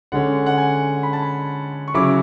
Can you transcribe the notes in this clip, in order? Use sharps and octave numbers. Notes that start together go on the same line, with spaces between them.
D3 G#3 C#4 F#5
F#5
G#5
B5
A5
B5
C#6
C#3 F#3 C#4 E4 D6